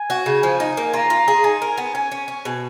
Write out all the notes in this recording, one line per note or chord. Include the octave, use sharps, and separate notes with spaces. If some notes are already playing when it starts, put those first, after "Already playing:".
Already playing: G#5
F#4
C#3
F3 G#5
D#4
A#3
F4 A#5
F4
G#4
D#4 G#5
A#4
B3
C#4 G#5
C#4
C#4
B2